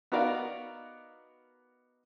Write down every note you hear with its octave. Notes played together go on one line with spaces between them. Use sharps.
B3 D#4 F#4 A#4 D5 F5